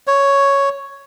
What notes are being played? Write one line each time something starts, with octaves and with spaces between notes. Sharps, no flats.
C#5